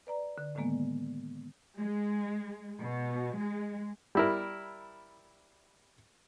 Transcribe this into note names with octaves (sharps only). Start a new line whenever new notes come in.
B4 D5 A#5
D3
A2 D3 D#3 G#3 A#3 B3
G#3
B2
G#3
G3 E4 A#4